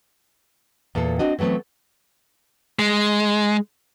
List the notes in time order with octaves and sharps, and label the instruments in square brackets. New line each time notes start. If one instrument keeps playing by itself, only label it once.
[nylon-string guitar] E2 A#2 A#3 A4
C4 D4 F#4 D#5
E3 F#3 A3 B3 C4
[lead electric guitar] G#3